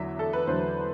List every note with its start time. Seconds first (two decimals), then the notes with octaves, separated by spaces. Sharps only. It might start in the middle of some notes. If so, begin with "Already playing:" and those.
Already playing: E2 D3 F#3 E5
0.19 A4
0.33 B4
0.47 E2 D3 F#3 C5